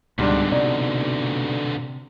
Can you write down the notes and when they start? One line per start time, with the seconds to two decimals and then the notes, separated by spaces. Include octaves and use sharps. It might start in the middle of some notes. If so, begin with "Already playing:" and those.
0.19 C#2 G#2 B2 D3 G3 D4
0.52 C3 D#4 F#4 D5